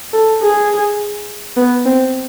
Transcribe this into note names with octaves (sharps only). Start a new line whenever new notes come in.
A4
G#4
B3
C4